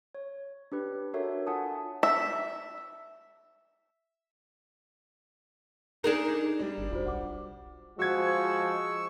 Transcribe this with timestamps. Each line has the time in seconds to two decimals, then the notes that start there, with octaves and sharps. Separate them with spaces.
0.15 C#5
0.72 D4 G4 B4
1.14 D4 F#4 A4 A#4 C#5 E5
1.47 F4 F#5 G#5 A5 D#6
2.03 E5
6.04 D4 D#4 G#4 A#4
6.59 G3 D4
6.78 G1
6.91 D#1 F4 F#4 C5
7.06 B1 F#5 D6
7.99 F3 G#3 F#4 C#6 E6 G#6